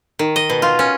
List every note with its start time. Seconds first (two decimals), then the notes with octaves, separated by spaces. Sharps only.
0.19 D#3
0.36 D#5
0.49 B2
0.62 F4
0.79 C#4